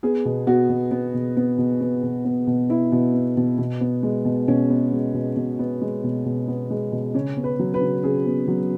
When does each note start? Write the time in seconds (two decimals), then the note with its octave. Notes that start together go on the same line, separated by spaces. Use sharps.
0.03 B3 G#4
0.25 B2
0.47 B3 F#4
0.69 B2
0.91 B3
1.14 B2
1.37 B3
1.58 B2
1.81 B3
2.03 B2
2.25 B3
2.47 B2
2.69 B3 E4
2.92 B2
3.14 B3
3.37 B2
3.58 B2
3.81 B3
4.03 G#3
4.25 B2
4.48 B2 C#4
4.70 B3
4.92 G#3
5.14 B2
5.36 B2
5.59 B3
5.82 G#3
6.04 B2
6.25 B2
6.48 B3
6.70 G#3
6.92 B2
7.15 C#3 C#4
7.37 B3
7.44 B4
7.59 F#3
7.74 B4
7.81 C#3
8.03 C#3 G#4
8.26 B3
8.48 F#3